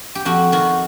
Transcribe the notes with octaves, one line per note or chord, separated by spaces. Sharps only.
G4
F2 F#4
D#3 F#4